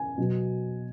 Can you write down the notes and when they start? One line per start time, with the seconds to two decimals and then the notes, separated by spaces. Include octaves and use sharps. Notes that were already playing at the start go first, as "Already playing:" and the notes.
Already playing: G#5
0.17 B2 F#3 B3